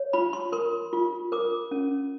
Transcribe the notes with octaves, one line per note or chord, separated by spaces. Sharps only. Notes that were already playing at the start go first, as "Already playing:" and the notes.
Already playing: C#5
F4 B5
C6
A#4 C6
F4
A#4 D6
C#4